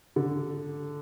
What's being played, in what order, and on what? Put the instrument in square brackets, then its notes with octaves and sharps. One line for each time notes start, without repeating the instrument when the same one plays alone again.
[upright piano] D3